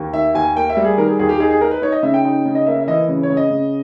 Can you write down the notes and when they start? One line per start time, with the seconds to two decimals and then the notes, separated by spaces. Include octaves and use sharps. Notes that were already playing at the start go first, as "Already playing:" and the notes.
Already playing: D#2
0.13 D#3 E5
0.34 D#2 G#5
0.56 A#3 G5
0.70 E5
0.77 G3
0.85 G#4
0.98 D#3 A#4
1.08 G#4
1.19 D#2 G#4
1.29 G4
1.40 D#4 G#4
1.51 G#4
1.61 D#4 A#4
1.71 B4
1.82 D#4 C#5
1.92 D#5
2.03 C#3 E5
2.14 G5
2.25 D#4
2.45 C#3
2.55 D#5
2.67 A#3 E5
2.80 E5
2.87 E3 D#5
3.09 C#3
3.23 C#5
3.30 C#3
3.37 D#5
3.50 C#3